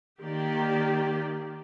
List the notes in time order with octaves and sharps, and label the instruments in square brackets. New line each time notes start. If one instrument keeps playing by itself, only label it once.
[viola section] D#3 A#3 G4 D5